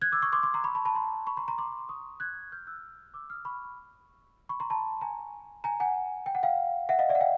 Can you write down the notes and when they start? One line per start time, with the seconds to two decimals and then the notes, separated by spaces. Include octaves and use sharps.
0.02 F#6 G#6
0.12 D6 E6
0.22 C#6 D#6
0.32 C6 D6
0.43 C6 D6
0.54 A#5 C6
0.64 B5 C#6
0.75 A5 B5
0.85 A5 B5
0.95 A#5 C6
1.27 B5 C#6
1.37 A#5 C6
1.48 A#5 C6
1.58 C6 D6
1.89 C#6 D#6
2.20 F#6 G#6
2.52 F6 G6
2.67 E6 F#6
3.14 D6 E6
3.30 D#6 F6
3.45 B5 C#6
4.49 B5 C#6
4.60 A#5 C6
4.70 A5 B5
5.01 G#5 A#5
5.64 G#5 A#5
5.80 F#5 G#5
6.26 G5
6.35 F#5
6.43 F5 G5
6.89 E5 F#5
6.99 D#5 F5
7.09 D5 E5
7.15 F#5
7.21 F5 G5